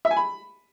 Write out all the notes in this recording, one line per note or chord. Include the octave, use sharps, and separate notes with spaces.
E5
G#5
B5